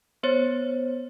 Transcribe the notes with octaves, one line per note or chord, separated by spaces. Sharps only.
B3 C5 C#5 A6